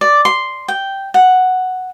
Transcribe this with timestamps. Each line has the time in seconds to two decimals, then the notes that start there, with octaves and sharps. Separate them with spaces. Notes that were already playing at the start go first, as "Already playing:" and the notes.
0.01 D5
0.25 C6
0.68 G5
1.14 F#5